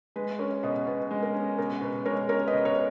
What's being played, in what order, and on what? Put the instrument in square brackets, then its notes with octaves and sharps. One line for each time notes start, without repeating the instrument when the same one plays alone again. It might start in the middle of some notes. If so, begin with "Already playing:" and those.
[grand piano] G#3 [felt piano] B4
[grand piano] C#4 [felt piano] A#4 C#5
[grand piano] B2 [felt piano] B4 D#5
[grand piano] B2 [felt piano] B4
[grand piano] G#3
[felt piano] A#4
[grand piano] C#4
[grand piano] B2 [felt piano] A#4
[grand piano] B2 [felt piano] B4
[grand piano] G#3 [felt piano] A#4 C#5
[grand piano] C#4 [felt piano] A#4 C#5
[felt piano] B4 D#5
[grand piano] B2
[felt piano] A#4 C#5